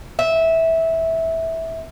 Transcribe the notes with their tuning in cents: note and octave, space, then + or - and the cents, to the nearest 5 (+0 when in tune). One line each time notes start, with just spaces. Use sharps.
E5 -15